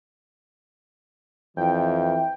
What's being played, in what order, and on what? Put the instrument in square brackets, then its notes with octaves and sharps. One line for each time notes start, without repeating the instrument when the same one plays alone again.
[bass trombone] F2 [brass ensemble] E3 [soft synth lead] G5